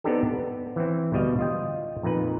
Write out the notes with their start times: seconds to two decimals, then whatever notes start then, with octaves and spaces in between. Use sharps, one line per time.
0.04 B3 C4 D4 D#4 G4 A4
0.34 B3
0.76 E3 C4
1.12 D2 B2 G3 D#5 F5
1.39 F4 D#5 G5
2.03 F2 A#2 D#4 B4